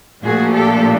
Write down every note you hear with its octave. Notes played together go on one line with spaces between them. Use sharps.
A#2 F3 A3 D4 F#4 G#4
G4 A4